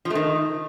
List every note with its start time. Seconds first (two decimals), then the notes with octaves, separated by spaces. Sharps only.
0.05 F3
0.10 A3
0.15 D#3